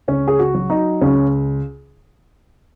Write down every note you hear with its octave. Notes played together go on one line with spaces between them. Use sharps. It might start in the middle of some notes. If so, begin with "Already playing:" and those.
C#2 C#4
G#4
F#4
F#3
D#4
C#2 C#4